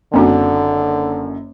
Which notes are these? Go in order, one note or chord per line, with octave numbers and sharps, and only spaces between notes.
F#1 F#2 D3 C4 D4 F#4